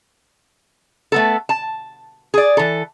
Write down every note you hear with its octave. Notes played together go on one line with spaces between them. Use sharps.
A3 B3 A4
A5
G#4 D5
E3 A4